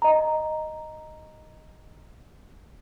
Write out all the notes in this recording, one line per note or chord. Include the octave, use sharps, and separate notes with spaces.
D#5 A#5